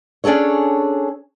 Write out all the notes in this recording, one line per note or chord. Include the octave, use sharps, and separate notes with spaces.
C#4 D4 G#4 A4 C#5